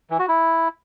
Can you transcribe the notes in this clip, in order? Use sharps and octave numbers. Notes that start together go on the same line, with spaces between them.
E3
F#4
E4